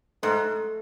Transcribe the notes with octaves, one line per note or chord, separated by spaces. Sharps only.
G#2 A3